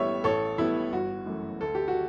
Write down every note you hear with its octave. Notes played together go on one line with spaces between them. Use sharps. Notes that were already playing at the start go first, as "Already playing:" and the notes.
Already playing: A1 A2 G3 B3 C#5 E5
A1 A4 C#5
A2 G3 B3 E4
G1 F#4
F#2 E3 A3
D2 A4
G4
F#4